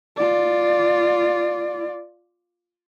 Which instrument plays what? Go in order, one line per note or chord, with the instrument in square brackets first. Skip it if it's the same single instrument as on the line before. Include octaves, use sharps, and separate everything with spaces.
[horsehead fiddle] F4 D5